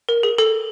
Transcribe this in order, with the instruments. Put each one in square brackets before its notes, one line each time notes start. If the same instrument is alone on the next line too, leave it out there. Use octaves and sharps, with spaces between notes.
[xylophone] A#4
G#4
A4